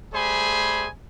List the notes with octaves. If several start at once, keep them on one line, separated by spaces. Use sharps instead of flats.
G3 A3 G#4 C5 G#5 B5